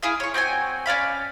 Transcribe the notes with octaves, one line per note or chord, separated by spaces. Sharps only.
E4 G#4 F5
C#5 C#6
C4 F#4 G5 G#5
C#4 D5 F5 B5